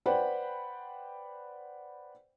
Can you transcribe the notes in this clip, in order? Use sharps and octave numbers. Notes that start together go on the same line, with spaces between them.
B4 C5 D5 F#5 G5 B5